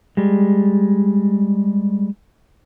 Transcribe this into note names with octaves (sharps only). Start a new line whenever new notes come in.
G3 G#3